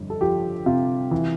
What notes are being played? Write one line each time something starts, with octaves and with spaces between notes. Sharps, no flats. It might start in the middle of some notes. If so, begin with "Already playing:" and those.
Already playing: G1 F2
A4
F3 G4
C3 F4
E3